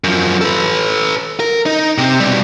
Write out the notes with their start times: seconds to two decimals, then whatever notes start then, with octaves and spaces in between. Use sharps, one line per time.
0.04 F#2 F3
0.41 A4 B4
1.40 A#4
1.66 D#4
1.98 C3 C4
2.20 B2 G3